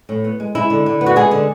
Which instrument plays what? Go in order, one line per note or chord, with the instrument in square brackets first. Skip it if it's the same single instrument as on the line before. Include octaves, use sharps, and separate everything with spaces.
[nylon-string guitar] A2
B3
G#3
G#3 E4
D3
D3
B3
F#4
G#3 G#4
D3